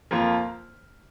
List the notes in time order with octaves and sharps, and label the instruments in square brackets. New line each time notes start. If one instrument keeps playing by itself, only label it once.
[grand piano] F2 F3 A#3 F4